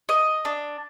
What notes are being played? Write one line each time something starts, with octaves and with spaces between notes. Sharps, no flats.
D#5
D4